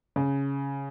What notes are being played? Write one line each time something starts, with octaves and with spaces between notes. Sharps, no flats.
C#3